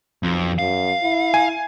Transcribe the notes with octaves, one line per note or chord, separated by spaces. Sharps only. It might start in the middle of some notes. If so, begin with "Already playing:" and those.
B1 F2
F#2 F5
E4
G#5